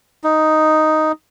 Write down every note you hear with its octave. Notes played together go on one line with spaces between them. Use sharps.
D#4